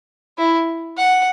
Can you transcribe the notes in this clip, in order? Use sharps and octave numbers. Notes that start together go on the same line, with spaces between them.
E4
F#5